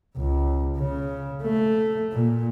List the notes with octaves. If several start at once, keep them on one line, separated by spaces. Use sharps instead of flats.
C#2
C#3
A3
A#2